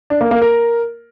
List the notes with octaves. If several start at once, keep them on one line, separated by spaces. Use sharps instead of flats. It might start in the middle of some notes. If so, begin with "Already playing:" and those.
D4
A#3
A#3
A#4